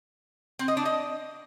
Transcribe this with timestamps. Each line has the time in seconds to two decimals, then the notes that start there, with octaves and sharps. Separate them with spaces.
0.59 C4
0.68 D#5
0.77 D4
0.85 D#5